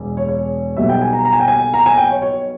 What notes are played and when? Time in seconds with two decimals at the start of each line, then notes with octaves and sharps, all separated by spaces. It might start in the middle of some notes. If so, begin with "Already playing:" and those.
Already playing: E1 E2
0.17 C#5
0.29 C#5
0.77 B1 B2 G3 E5
0.89 G5
1.02 G#5
1.13 A#5
1.25 A#5
1.33 G#5
1.40 G5
1.48 G#5
1.74 A#5
1.86 G#5
1.98 G5
2.10 C#5
2.22 C#5